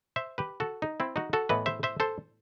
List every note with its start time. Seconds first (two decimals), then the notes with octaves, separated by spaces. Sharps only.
0.16 C5 E5
0.38 G4 B4
0.60 F#4 A4
0.82 D#4
1.00 C4 E4
1.16 D#4 F#4
1.33 F#4 A4
1.49 A2 E3 B3 B4 D#5
1.66 C5 E5
1.83 C5 E5
2.00 A4 C5